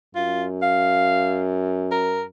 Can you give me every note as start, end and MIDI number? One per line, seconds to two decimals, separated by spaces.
0.15 2.30 42
0.15 0.45 65
0.62 1.44 77
1.91 2.23 70